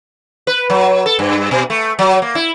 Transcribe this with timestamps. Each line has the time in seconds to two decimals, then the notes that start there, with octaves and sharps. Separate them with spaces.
0.47 B4
0.70 F#3
1.06 A4
1.19 G2
1.51 B2
1.70 A3
1.99 F#3
2.22 A#3
2.35 E4